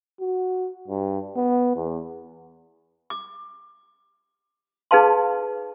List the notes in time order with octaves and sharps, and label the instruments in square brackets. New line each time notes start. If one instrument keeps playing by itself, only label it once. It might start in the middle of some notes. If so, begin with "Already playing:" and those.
[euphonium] F#4
G2
B3
E2
[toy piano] D6
D#4 G#4 B4 F5 A5 C6